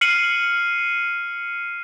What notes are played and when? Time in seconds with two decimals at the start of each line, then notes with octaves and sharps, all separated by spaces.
0.01 F6 C7 C#7 D#7 F#7